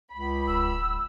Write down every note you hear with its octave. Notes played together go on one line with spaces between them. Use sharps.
C#2 B5
D1 E6